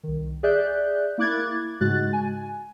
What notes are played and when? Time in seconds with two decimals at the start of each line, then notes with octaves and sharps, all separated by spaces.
0.03 C2 D#3
0.43 G#4 D5 E5 F#6 G6
1.18 A#3 E4 D6 F#6 G#6 A6
1.80 G#2 C#3 G#3 F#4 F#6 A6
2.13 G#5